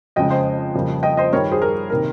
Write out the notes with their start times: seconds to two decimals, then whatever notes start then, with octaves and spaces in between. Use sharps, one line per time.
0.16 F2 C#3 G#3 D#5 G5
0.30 C5 D#5
0.75 F2 C#3 G3 A#3
1.03 D#5 G5
1.17 C5 D#5
1.32 G2 D#3 G3 A#4 C#5
1.51 G#4 C5
1.62 A#4
1.90 C3 D#3 A#3 A#4